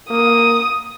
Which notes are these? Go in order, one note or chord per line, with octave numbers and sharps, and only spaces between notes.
A#3 D#6